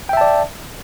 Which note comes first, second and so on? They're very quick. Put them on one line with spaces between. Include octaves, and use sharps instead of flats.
G5 E5 A5 D5